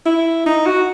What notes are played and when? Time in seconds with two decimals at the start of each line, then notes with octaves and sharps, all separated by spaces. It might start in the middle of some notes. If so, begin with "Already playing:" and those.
0.06 E4
0.47 D#4
0.66 F#4